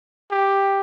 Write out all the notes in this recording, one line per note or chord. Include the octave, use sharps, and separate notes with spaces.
G4